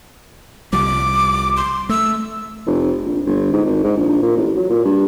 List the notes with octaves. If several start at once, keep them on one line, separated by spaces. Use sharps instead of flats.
C2 F3 G3 D6
C6
A3 E6
F1
A#1
G1
G#2
G#1
G#2
A#1
A#2
A1
F#3
A#2
G2